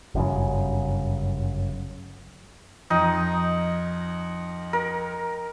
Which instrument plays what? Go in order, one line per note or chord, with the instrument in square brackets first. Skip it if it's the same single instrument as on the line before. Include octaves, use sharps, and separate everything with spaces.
[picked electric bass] G1 F#2 A2 C#3
[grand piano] F2 [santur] D#4
[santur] A#4